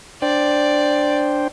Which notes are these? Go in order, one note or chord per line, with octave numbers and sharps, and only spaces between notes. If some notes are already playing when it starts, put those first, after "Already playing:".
D4 C5 D5 G5